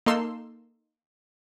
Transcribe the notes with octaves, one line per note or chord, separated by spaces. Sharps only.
A#3 D#4 A4 C6 E6